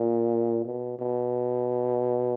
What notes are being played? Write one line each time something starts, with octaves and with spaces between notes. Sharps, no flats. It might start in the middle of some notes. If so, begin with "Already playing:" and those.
Already playing: A#2
B2
B2